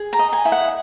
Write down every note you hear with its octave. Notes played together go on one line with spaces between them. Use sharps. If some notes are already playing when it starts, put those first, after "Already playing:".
Already playing: G#4
A#5
D#5
G#5
E4
F#5